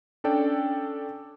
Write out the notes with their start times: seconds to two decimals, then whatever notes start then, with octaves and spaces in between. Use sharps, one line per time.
0.24 C#4 D4 A4 D5 G5